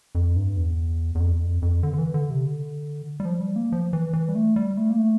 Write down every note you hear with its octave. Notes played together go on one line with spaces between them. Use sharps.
F2
G2
E2
E2
F2
E2
F2
F2
D3
D3
E3
D3
C3
D3
G3
F3
G3
A#3
F3
E3
E3
G3
A3
G3
A3
A#3
A3